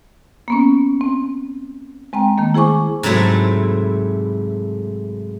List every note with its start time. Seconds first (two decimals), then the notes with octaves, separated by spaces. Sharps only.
0.48 A#3 B3 C#4
1.01 C4
2.13 G#3 C4 G5 A#5
2.38 D#3 A3 A#3
2.54 E4 G#4 C5 G#5 C#6 D6
3.03 G#2 C3 F#3 A3 E4